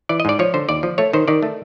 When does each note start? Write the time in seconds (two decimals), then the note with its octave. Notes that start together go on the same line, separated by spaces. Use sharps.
0.09 E3 D5
0.20 D#5
0.25 G#2 D5
0.39 F3 C#5
0.54 D3 C5
0.69 D#2 D5
0.83 F3
0.98 A3 C#5
1.13 D#3 C5
1.28 D#3 D5
1.42 A3